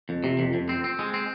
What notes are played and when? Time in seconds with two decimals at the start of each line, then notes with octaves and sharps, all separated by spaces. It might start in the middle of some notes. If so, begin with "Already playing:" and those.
0.09 F2
0.24 C3
0.39 F2
0.54 F2
0.69 C4
0.84 C4
0.99 G#3
1.14 C4